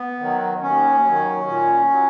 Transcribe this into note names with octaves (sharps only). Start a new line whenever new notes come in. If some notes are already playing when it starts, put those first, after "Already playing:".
Already playing: B3
D#3 F#3
D#2 C#4
F#3
D#3
A#2
F#3